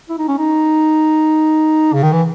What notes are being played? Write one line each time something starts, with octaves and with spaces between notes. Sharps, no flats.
E4
D#4
C#4
D#4
C#3
D#3
E3